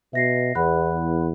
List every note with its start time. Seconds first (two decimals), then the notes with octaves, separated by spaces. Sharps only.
0.13 B2 E5 A#6 C7
0.55 E2 F#5 B5 F#6